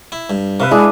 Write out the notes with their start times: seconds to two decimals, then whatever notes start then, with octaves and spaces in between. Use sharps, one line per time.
0.12 E4
0.30 G2
0.60 C3 B4 E5 F5
0.71 G#3 D4 E4 G#4